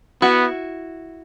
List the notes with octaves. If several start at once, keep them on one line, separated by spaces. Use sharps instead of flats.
B3 E4 F#4